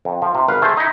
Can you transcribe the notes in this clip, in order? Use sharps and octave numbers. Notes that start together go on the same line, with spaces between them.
F2
F3
C3
G#1 B4 F5
A3 G#4 C5
D#4 E4